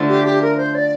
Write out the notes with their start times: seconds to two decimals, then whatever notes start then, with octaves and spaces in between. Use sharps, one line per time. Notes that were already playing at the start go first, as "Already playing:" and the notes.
Already playing: D3 F3 A3 D4
0.08 G4
0.25 G4
0.42 A#4
0.57 C5
0.75 D5